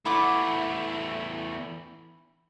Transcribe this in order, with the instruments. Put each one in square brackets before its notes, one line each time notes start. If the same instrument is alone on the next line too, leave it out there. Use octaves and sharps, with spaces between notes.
[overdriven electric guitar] E2 A3 [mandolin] E4 F#5 D6